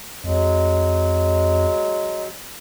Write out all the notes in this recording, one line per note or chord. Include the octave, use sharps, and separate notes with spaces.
F2 F#3 G#3